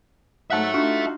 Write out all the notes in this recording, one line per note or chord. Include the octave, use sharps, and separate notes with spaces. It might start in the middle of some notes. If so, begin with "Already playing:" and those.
G#2 F#3 E5 F#5 A5
D4 D#4 F4 F#4